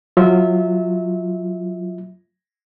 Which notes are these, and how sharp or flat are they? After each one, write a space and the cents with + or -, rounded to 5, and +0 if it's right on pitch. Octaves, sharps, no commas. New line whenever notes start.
F#3 -25 F4 -15 E5 -25